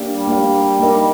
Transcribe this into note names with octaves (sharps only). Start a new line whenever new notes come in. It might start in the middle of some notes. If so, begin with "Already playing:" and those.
Already playing: A#3 D4 G4 D5 F5
G3
A#3 D4 G4 D5 F5
A#3 D#4 A#4 D#5